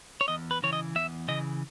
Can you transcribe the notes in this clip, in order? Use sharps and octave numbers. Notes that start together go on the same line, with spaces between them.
C#5
E2 D#5
B4
C#3 E3 C#5
D#5
E2 E5
C#3 E3 D#5